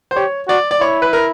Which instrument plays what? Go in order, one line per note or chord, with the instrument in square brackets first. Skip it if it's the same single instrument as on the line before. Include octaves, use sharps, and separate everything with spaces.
[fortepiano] C5
[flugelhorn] G4 [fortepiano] C#5
[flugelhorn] F#4 [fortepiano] D5
[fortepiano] D5
[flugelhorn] E4 [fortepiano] C#5
[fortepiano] B4
A#4